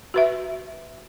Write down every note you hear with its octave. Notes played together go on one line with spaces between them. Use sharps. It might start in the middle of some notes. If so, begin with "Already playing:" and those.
F#4 B4 E5